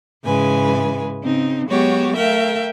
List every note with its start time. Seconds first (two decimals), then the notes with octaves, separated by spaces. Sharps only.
0.23 G#2 C#3 E3 G#3 B4 G#5
1.22 C#3 C4 D#4
1.67 F#3 G#3 B3 F#4 G4 C#5
2.16 A3 A#4 E5 F5 G5